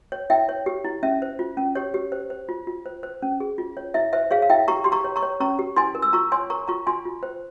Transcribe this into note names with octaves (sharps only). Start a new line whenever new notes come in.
C#5
E4 E5 G5
C#5
G4
E4
C#4 E5
C5
F4
C#4
G4 C#5
G4
C5
C5
F4
F4
C5
C5
C#4
G#4
F4
C#5
E4 E5
C5 E5
G#4 C#5 F5
F5
E4 E5 G5
G4 A#5 C#6
G4 C6
A#5 C#6
C#5
A#5 C#6
C#5
C#4 A#5 C#6
G4
E4 G#5 C6
A#4
E6
F4 A#5 C#6
C#5 G#5 C6
A#4 A#5 C#6
F4 A#5 C#6
F4 G#5 C6
F4
C5